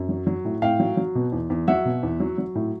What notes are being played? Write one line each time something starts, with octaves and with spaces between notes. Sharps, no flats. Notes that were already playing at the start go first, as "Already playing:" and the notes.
Already playing: F#2
F#3
F#3
A2
A2 F5 G5
F#3
F#3
B2
E2
E2
F#3 E5 F#5
B2
E2
F#3
F#3
A2